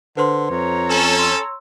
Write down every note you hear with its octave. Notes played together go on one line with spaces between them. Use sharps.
D3 B4 C5 C6
F2 C#5 A#5
C#4 A4
C6 E6